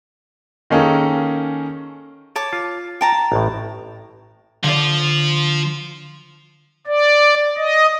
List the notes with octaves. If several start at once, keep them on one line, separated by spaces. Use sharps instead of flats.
D#3 A#3 C#4 G#4 A4
C#5 A5 D6
F4
G5 A5 A#5
A1 A2
D3 F3 F4 D5
D5
D#5